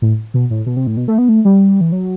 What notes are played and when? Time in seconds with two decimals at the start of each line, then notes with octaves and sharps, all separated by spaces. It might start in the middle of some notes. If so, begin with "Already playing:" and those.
0.02 A2
0.34 B2
0.50 A2
0.66 B2
0.77 C3
0.87 A2
0.97 B2
1.08 A3
1.18 B3
1.29 A3
1.45 G3
1.81 E3
1.92 F#3